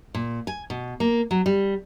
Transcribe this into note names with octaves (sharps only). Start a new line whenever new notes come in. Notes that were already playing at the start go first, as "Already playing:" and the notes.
A#2
G#5
B2
A#3
F#3
G3